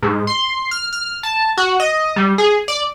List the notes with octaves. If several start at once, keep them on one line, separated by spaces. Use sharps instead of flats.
G#2
C6
F6
F6
A5
F#4
D#5
G3
G#4
D5